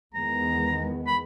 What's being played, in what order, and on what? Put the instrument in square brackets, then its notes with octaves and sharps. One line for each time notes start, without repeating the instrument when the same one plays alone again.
[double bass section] E2 D#3 G#3 B3 [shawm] A#5
[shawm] B5